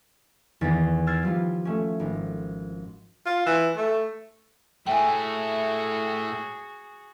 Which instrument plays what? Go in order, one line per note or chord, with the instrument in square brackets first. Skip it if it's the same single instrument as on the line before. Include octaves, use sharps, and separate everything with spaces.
[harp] E2 D#3 B3 A6 B6
E6 F6 G#6 A6 C7
F3 G3 F4
A3 C#4
G#1
[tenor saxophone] F4
E3
A3
[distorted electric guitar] A2 A3 [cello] F#4 G#4 [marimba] G5 G#5